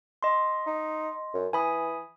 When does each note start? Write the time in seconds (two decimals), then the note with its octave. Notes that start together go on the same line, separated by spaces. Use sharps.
0.23 D#5 C6
0.67 D#4
1.34 F#2
1.53 E3 G#5 B5 D#6